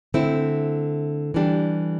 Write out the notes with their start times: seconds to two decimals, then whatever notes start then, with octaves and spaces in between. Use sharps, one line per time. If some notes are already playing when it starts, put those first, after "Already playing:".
0.14 D3 A3 C4 E4
1.34 E3 G3 D4 G4